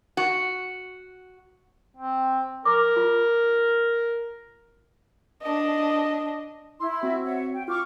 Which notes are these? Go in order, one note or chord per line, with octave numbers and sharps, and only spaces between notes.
F#4
C4
A#4 C#6 D6
F4
D4 D#5
E4 C6
C6
C4 F#4
C#5 E5 F#5
G5
F4 C#6 D6 F6